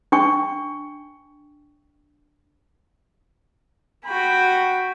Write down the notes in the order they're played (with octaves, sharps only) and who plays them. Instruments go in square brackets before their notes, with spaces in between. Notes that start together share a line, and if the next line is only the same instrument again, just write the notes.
[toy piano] D4 G5 C#6
[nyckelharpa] F#4 B5 [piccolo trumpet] G5